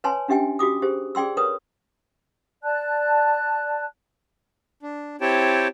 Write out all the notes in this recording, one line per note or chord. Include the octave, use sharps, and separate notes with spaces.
B4 C#5 G#5 A5 C6
C#4 D4 G4 E5 G5 G#5
F#4 G4 D6 D#6
G4 G#4 C5
G#4 D5 G5 C6 E6
A#4 B4 C#5 D#6
D5 A5 F#6
D4
C4 E4 G4 C#5 G5 A5